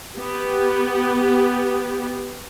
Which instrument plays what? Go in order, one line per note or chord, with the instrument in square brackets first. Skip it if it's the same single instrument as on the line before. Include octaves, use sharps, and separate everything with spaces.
[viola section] B3 G4